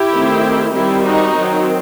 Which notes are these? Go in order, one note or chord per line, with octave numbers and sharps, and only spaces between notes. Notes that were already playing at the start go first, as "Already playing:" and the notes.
Already playing: E4 G4
D#3 A3 C4
D#3 G3 C4 E4 G4
D#4 F#4
D#3 F#3 C4